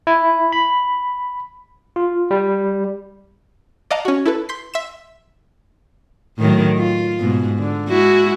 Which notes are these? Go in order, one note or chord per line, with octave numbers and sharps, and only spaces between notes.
E4
B5
F4
G3
D5 D#5 F5 F#5 A5 A#5
C#4 F#4
E4 A4 B4
C6 G6 B6 C7
E5 C6 E7
A2 D#3 F#3
F4
G#2 B2
D3
G#3 E4 F#4